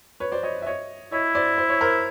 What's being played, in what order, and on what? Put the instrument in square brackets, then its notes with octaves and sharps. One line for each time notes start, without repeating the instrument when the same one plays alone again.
[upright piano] B4 C#5
C5 D5
C#5 D#5
E5
C#5 D#5
[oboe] E4 [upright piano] C#5 D#5
[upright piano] C5 D5
C5
C#5
A#4 C5